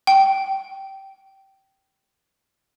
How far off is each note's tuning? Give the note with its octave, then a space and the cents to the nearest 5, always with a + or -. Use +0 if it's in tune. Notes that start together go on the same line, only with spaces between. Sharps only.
G5 -15